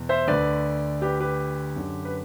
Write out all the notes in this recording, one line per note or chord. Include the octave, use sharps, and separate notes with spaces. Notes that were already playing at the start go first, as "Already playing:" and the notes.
Already playing: E2 B2
C5 E5
D2 D3 B4 D5
G4 B4
G4 B4
F#2 D3
B4